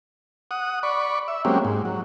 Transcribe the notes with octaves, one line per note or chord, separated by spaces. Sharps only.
F#5 D#6
D5 B5 C#6
E5
F#3 G#3 A#3 C4 C#4 G4
G#2
F#3